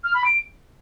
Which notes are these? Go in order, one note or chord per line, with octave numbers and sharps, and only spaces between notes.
F6
B5
D7